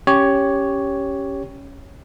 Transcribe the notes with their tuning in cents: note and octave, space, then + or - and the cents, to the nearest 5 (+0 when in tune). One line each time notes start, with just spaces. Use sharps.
C#4 +0 G4 +0 C#5 +5